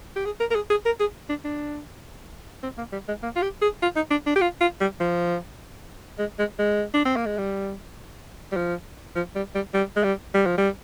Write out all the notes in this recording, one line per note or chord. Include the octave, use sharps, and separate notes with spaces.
G4
G#4
A#4
A#4
G#4
G#4
A#4
G#4
D4
D4
C4
A#3
G3
G#3
A#3
F4
G4
G#4
F4
D#4
D4
D4
G4
F4
F4
G3
F3
G#3
G#3
G#3
D4
C4
A#3
G#3
G3
G3
F3
F3
G3
G3
G3
G#3
G3
G3
F3
G3